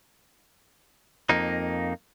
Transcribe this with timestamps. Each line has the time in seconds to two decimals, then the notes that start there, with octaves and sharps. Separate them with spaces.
1.30 F2 A#3 D#4